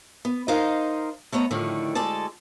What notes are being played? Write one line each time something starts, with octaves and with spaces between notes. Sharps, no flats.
B3
D#4 A#4 C5 D#5 F5
A3 B3 C#5 D#5 A#5
A2 D3 D#3 F3 G3
D2 G#3 A4 D5 A5